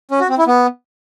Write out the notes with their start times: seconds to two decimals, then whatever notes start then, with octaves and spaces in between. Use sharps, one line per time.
0.11 C#4
0.20 F#4
0.29 C4
0.38 E4
0.47 B3